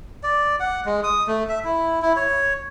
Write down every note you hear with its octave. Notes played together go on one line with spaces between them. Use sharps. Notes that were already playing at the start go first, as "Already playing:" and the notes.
D5
F#5
G#3
D#6
A3
E5
E4
E4
C#5